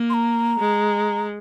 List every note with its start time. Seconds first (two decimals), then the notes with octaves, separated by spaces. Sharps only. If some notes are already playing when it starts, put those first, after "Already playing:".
Already playing: A#3
0.10 C6
0.14 A#5
0.59 G#3